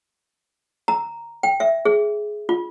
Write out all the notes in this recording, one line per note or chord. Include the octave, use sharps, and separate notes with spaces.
A#5
G5
E5
G#4
F4